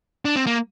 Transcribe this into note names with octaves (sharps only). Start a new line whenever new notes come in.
D4
C4
A#3